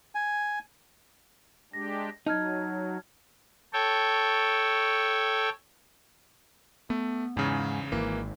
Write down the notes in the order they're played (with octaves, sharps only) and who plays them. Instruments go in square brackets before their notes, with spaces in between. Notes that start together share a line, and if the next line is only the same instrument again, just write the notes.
[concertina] G#5
[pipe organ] G#3 D4 G4 [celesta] A#6
[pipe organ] F#3 [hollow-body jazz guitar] D#4 [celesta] A5 F6 G#6
[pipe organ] A4 C#5 G5
[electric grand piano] A3 [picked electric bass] B3
[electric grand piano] E2 C#3 [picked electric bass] G#2
[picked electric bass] G#1 [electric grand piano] E3 A#3